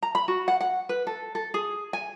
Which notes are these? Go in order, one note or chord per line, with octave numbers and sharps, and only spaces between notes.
A#5
B5
F#4
F#5
F#5
B4
A4
A4
G#4
G#5